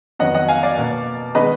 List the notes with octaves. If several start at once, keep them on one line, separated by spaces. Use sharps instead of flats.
F2 D#3 F#3 B3 D#5 F#5
D#5 F#5
F5 G#5
D5 F5
B2 A#3
D#3 G#3 B3 B4 D#5